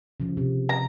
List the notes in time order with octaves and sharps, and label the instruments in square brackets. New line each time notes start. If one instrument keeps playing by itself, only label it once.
[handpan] C#3 F3
C3
[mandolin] A#5